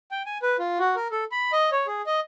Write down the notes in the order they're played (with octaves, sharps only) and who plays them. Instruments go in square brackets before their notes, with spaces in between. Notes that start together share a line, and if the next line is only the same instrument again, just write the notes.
[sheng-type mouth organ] G5
G#5
B4
F4
F#4
A#4
A4
B5
D#5
C#5
G#4
D#5